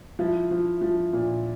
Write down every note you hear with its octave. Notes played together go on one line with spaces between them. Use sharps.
F3 E4
F3
F3
A#2